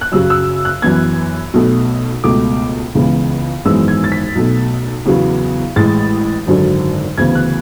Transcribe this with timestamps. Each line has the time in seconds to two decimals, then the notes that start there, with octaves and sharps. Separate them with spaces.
0.01 F#6
0.12 F#2 C#3 F#3 E6
0.30 E6
0.65 F#6
0.82 F#2 E3 B3 G#6
1.54 B1 B2 A3
2.24 C#2 B2 A3 D6
2.95 C#2 C#3 E3 B3
3.65 G#1 F#2 E3 G#3 B3 E6
3.88 G#6
4.04 A6
4.12 B6
4.35 B1 B2 A3
5.06 E2 C#3 F#3 B3
5.76 A1 A2 G#3 A6
6.47 G#1 F#2 D3 F#3
7.18 D2 C#3 E3 B3 G#6
7.35 F#6